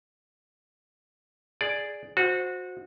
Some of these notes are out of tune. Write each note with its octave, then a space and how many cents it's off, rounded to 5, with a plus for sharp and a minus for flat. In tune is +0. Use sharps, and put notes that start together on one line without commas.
G#4 +0 D5 +0
F#4 -25 C5 +0